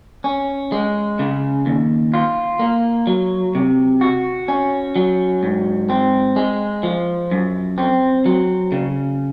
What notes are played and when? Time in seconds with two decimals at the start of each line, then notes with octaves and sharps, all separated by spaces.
0.24 C#4
0.72 G#3
1.19 C#3
1.66 D#2
2.14 F4
2.59 A#3
3.07 F#3
3.55 C3
4.01 F#4
4.48 C#4
4.96 F#3
5.43 G#2
5.90 C4
6.36 G#3
6.83 F3
7.31 F#2
7.78 C4
8.26 F#3
8.72 C#3